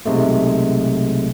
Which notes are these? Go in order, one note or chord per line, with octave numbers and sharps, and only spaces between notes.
B1 C3 G#3 A3